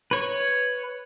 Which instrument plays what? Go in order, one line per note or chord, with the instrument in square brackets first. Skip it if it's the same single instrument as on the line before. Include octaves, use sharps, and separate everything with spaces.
[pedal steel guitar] B4 C#5